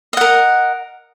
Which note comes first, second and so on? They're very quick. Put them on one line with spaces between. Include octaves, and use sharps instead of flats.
D#5 F#5 A#4